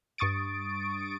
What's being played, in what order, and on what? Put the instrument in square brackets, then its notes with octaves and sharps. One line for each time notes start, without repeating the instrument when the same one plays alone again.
[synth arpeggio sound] G2 C#6 D#6 A6 D7